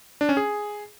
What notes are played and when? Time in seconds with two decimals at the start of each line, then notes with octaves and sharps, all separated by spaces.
0.21 D4
0.29 C#4
0.37 G#4